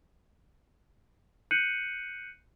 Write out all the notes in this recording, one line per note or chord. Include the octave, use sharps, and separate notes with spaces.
F#6 G6 C7 C#7 D#7 F#7